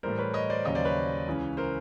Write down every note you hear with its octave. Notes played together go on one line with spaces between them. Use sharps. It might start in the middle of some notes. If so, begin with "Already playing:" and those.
A2 E3 G3 A#4 C5
B4 C#5
C#5 D#5
C5 D5
D#2 C#3 F#3 C#5 D#5
C5 D5
B4 C#5
C#2 C#3 E3
A#4 C5